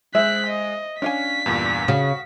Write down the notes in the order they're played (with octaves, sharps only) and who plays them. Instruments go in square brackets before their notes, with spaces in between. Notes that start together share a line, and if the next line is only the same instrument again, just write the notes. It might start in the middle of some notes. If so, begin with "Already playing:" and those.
[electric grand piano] G#3 [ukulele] C5 E5 [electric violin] F#6 B6
[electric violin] D#5
[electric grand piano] C#4 [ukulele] D4 F5 G#5 [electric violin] B6
[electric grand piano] E2 G2 A#2
[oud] C#3 [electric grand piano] F#4